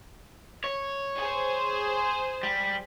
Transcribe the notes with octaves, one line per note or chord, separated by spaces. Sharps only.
C#5
G#4 C5
G3